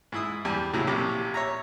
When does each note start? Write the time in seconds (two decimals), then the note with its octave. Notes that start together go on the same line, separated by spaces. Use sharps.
0.12 G#2 E4 D#6
0.45 E2 G3 B5
0.73 A2 C#3 F#3 E4
0.87 A#1 C3 G4 D6
1.34 C#5 E5 A#5